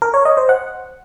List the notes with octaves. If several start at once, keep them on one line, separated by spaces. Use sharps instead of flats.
A#4
C#5
D#5
C5
F#5